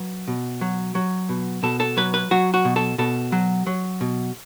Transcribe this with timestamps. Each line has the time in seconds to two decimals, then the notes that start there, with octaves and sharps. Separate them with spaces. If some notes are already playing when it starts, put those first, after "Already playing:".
Already playing: F#3 B4
0.28 B2
0.61 F#3
0.95 F#3
1.29 B2
1.63 B2 A4
1.80 A4
1.97 F#3 B4
2.14 B4
2.31 F#3 F#4
2.54 F#4
2.65 B2
2.76 A4
2.98 B2 A4
3.32 F#3
3.67 F#3
4.01 B2